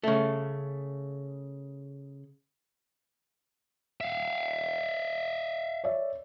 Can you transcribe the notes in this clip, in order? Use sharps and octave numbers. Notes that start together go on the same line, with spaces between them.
C#3 A3
E5 F5
C#5 D5 E5